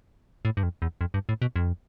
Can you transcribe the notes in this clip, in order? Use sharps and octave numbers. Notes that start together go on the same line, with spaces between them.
A2
G2
F2
E2
F2
G2
A2
B2
F2